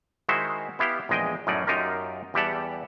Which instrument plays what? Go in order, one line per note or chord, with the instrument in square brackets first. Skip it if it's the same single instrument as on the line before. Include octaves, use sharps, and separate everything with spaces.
[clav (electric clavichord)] D#3 G#3 E4 F#4 C5 E5
B3 E4 G4 F5 G5
A#1 E2 G#3 D#5 G5
F#2 A2 F#3 C#4 D#4 D5
F#2 D#4 F4 G4 A#4
E2 G3 G4 E5 F#5 A5